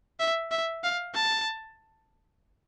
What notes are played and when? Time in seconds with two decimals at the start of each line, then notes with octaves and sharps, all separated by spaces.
0.20 E5
0.51 E5
0.84 F5
1.15 A5